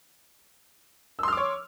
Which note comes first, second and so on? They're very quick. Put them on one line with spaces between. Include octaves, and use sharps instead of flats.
E6 C6 F6 D6 C#5